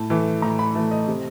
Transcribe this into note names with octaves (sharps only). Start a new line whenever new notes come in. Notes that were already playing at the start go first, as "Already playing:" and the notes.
Already playing: A2 A5
E3 A3
A2 A#5
B5
E3 A3
D#5
C3